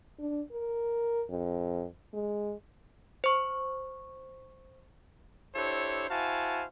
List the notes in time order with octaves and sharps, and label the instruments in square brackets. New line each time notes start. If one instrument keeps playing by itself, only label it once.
[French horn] D4
A#4
F2
G#3
[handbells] C5 C#6
[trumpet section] D4 E4 G4 A4 C5 C#5
E4 F#4 C5 F5 G#5 A5